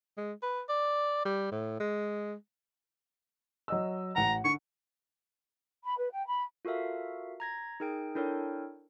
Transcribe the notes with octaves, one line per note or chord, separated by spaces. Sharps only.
G#3
B4
D5
G3
A2
G#3
F#3 D#5 E6
A1 F#5 A#5
D3 C#6
B5
B4
G5
B5
F4 F#4 A4 A#4 E5 F5
A#5 G#6 A#6
D#4 G#4 A#4 G5 D7
D4 E4 A4 A#4 C#5 G5